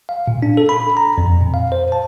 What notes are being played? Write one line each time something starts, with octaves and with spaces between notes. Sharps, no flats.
F5
A#2
D4
A4
B5
A#5
F2
A#2
F5
C5
A5